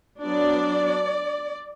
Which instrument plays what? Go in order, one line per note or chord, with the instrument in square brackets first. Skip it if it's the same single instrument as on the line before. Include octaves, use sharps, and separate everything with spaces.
[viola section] F#3 B3 D4 D5